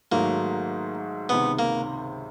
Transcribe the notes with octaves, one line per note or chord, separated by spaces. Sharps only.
G#2 D#3 F#3 A3 A#3
C#2 C3 D#3 B3
A#3